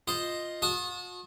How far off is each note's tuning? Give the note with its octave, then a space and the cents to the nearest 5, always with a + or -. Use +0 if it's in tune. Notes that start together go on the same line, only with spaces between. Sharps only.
F4 +0 C5 +0 D#5 +0
F#4 -45 A5 -20 D#6 +0